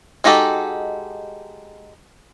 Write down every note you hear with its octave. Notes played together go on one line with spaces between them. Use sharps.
G#3 D#4 F#4 G4 A4